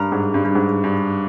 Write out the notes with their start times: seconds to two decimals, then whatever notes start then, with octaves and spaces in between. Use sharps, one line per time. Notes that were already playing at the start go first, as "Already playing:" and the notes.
Already playing: G2 A#4
0.12 G#2
0.34 G2
0.45 G2
0.55 G#2
0.84 G2